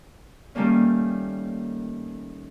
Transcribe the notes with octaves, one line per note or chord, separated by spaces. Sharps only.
D#3 G3 A3 A#3 C#4